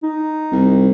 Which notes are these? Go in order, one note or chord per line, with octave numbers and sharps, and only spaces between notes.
D#4
C2